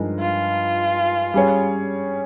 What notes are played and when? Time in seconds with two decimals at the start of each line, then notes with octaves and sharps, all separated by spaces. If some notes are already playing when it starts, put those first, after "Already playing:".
Already playing: G2 F3 G#3 D#4 A#4
0.19 F4
1.34 G3 C#4 G#4 C#5